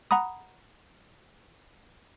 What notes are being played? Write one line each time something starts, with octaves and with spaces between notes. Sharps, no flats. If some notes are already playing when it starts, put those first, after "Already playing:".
F#5 A#5 B5 D#6